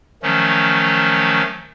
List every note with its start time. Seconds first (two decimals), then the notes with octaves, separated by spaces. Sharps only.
0.23 D#3 F3 F#3 A3 C#4